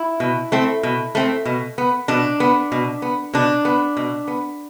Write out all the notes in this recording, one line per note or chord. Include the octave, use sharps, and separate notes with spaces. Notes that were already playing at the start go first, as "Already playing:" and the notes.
Already playing: E4
B2
A3 C4
B2
A3 C4
B2
B3
B2 D4
B3
B2
B3
B2 D4
B3
B2
B3